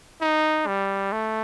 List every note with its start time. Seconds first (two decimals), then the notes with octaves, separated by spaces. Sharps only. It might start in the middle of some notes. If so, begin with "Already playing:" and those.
0.21 D#4
0.67 G3
1.12 A3